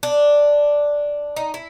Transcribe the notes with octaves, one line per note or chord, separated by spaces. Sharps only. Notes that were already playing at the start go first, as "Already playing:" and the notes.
D4
D#4
E4